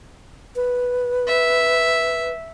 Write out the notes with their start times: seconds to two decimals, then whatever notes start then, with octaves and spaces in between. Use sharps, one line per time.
0.56 B4
1.27 E5